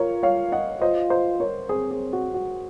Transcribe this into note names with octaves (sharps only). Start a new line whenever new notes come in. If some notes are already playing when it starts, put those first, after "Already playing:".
Already playing: F4 A#4 C#5
C#5 F5
D#5 F#5
F4 C5 D#5
C5 D#5
A#4 C#5
C4 G#4 C5
G#4
F#4
F#4